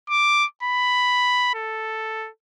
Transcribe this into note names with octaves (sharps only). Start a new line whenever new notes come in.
D6
B5
A4